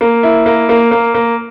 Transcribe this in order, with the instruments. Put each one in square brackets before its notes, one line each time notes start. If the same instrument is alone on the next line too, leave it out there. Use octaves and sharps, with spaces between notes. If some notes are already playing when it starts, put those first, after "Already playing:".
[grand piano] A#3
E4
A#3
A#3
A#3
A#3